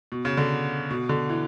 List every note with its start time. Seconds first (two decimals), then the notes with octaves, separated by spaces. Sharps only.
0.12 B2
0.25 C#3
0.37 D3
0.90 B2
1.09 D3
1.29 E3